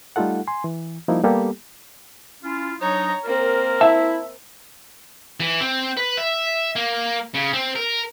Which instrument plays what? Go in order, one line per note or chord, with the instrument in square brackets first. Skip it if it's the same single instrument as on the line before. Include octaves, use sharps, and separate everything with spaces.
[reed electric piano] G3 A3 D#4 F4 A4 F#5
G#5 C6
E3
F3 G3 A#3 D#4 E4
G3 A#3 B3 G4 A4
[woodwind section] C#4 E4 F4
[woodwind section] F#3 D4 D#4 [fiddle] C#5 A#5
[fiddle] A#3 C4 [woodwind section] A#4
[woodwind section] E4 [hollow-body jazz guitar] E5 A5
[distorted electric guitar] E3
C4
B4
E5
A#3
C#3
C4
A#4